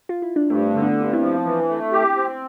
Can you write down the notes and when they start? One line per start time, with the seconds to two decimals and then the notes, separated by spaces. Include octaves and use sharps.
0.09 F4
0.22 E4
0.36 D4
0.50 G2 A3 C4
0.74 D3
0.82 B3 D4
0.98 G2
1.13 C4 E4
1.21 F3
1.45 E3
1.69 A3
1.92 G4
2.16 C4